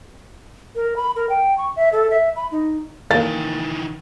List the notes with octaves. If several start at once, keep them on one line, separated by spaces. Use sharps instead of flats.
A#4
B5
A#4
G5
C#6
E5
A4
E5
B5
D#4
D#3 E3 A#3 A6